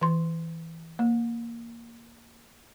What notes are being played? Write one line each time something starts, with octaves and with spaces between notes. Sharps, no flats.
E3 C6
A#3